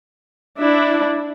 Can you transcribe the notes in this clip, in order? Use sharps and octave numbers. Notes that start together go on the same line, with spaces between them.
D4 E4